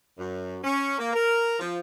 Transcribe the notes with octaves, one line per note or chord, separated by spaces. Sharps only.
F#2
C#4
A#3
A#4
F3